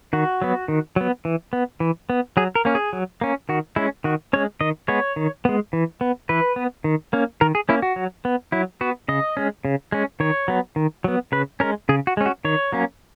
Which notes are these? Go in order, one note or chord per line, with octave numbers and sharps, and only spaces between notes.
D#3 F#4
F#3 B3
D#3
F#3 B3
E3
B3
E3
B3
F#3 G#4
A#4
A#3 C#4
G#4
F#3
A#3 C#4
D#3 F#4
G#3 C#4 E4
D#3 F#4
G#3 C#4 C#5
D#3 D#5
G#3 B3 C#5
D#3
G#3 B3
E3
B3
E3 B4
B3
D#3
A#3 C#4
D#3 A#4
G#4
A#3 C#4 E4
F#4
F#3
B3
F#3 E4
B3 F#4
C#3 D#5
G#3 C#4
C#3
G#3 C#4
D#3 C#5
F#3 B3
D#3
F#3 B3
C#3 B4
G#3 C#4 A#4
C#3 G#4
F#4
G#3 C#4
F#4
D#3 C#5
F#3 A#3 C#4